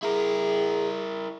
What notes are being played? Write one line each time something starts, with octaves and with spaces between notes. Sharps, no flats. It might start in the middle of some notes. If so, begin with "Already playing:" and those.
E4 G#4 A#4